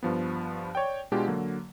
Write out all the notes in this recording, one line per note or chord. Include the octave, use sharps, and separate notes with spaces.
G2 F3 B3
C#5 D5 G5
B2 G#3 D4 F4 G4
D3 F#3 A#3